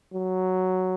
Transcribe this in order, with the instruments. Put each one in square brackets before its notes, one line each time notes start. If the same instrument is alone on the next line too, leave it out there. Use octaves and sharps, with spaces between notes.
[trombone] F#3